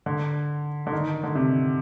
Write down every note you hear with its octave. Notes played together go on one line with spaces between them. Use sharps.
D3
D3
D#3
D3
C3